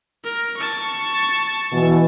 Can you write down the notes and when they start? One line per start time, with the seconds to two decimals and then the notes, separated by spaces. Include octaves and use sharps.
0.24 A#4
0.57 A5 C#6
1.72 B2 E3